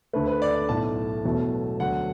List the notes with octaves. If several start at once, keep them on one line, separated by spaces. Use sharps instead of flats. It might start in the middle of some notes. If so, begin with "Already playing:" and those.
D2 D3 A3 B4
B4
D5
D5
B1 A2 A3 A5
E1 E2 B2 F#3 A3
D2 D3 F#3 F#5